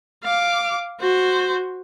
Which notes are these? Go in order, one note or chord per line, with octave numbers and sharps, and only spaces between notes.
F5 D6
F#4 C5